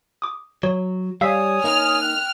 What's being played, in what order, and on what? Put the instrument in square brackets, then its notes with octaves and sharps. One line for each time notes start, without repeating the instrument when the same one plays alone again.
[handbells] D6 D#6
[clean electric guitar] F#3 [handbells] C#5
[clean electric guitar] G3 [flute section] C#5 G#5 D#6 [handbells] F5 E6 B6
[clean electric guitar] A#3 D#4 [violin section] F6
[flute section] G5 F#6